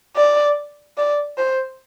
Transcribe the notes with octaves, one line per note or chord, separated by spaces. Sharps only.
D5
D5
C5